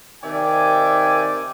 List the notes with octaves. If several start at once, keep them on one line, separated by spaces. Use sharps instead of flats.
C3 D#3 D5 E5 G5 G#5